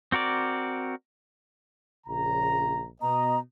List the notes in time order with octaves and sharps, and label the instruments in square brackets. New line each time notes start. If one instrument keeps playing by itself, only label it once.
[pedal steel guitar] C4 F#4 A#4 D5
[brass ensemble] A#1 C#3 A#5
[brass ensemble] B2 B3 D#5 [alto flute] A#5